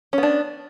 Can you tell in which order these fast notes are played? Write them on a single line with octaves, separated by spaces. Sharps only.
C#4 B3 D4